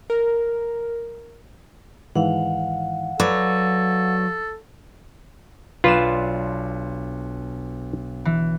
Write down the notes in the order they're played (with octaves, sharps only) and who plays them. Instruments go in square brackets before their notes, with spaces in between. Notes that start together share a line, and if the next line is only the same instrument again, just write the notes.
[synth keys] A#4
[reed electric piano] G#2 D#3 E3 [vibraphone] F5 F#5
[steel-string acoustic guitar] F#3 [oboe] A4 [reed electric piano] B4 D5
[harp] B1 D4 E7 [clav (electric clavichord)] F4 B4
[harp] E3